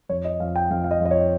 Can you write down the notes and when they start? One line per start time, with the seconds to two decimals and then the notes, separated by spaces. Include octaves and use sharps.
0.09 F2 C#5
0.25 D#5
0.40 F2 F5
0.56 G5
0.70 F2 F5
0.84 F5
0.91 D#5
1.00 F2
1.05 D#5
1.11 C#5